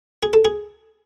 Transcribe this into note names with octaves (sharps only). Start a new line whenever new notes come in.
G#4
A4
G#4